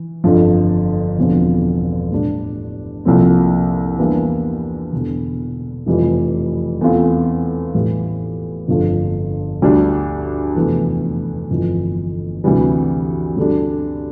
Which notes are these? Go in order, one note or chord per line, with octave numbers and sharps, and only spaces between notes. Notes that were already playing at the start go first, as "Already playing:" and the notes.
Already playing: E3
G1 F2 D3 F3
E1 E2 D3 F3 C4
A2 G3 D4
C2 A#2 F3 A3 C4
E2 E3 G3 A#3 D4
E1 E2 D3
F1 F2 E3 G3
E2 E3 A3 C4 F4
A1 A2 E3 G3
G1 F2 D3 F3 A3
D2 D3 G3 D4
F1 E2 E3 A3
G1 F2 E3
D2 C3 E3 G3
D2 D3 G3 D4